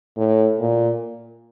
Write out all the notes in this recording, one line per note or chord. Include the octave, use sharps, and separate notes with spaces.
A2
A#2